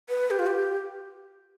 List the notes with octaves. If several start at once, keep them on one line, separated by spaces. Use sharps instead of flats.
B4
G4
F4
G4